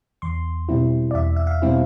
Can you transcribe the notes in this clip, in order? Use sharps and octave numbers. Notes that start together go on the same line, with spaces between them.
E2 C6
B2 G3 C4 E4
D5
E2 E5
E5
F5
B2 G3 C4 E4